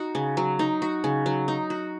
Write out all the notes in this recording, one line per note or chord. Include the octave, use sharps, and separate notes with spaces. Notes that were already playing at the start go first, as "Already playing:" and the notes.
Already playing: D#4 F#4
C#3
F#3
D#4
F#4
C#3
F#3
D#4
F#4